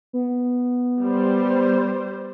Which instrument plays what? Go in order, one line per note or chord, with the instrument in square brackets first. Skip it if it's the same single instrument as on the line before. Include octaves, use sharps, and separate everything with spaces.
[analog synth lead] B3
[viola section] G3 C5